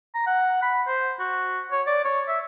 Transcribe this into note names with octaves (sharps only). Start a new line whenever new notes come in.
A#5
F#5
B5
C5
F#4
C#5
D5
C#5
E5